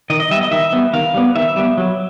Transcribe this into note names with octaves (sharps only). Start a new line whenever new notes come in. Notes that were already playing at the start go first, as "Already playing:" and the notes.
D#3 D#5
D#5
G3 B3 E5
D#5
D#3 E5
G3 B3
D#3 F5
G3 B3
D#3 E5
G3 B3
F#3